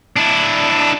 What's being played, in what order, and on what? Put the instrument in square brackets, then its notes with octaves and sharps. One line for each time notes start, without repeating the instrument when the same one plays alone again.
[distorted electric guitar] D4 E4